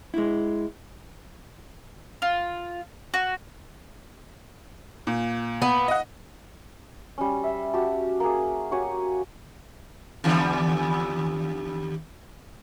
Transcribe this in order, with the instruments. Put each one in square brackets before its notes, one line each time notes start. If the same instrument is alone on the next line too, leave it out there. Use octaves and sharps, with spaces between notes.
[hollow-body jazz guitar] G#3 E4
[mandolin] F4
F#4
[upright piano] A#2
[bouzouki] B3
[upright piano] D#5 F#5
[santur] G3 C#4
E5
F#4 G4 A5
A#3 G#4
F#4 G4 C#5 G#5
[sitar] D#2 D3 G3